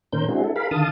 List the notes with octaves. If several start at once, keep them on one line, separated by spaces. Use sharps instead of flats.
A#2 D#3 C#4 A#4 C5 G6
G#3 C4 D4 E4 F#4 G#4
E4 A4
G#4 A#4 F5 B5
D3 D#3 F5 A5 D#6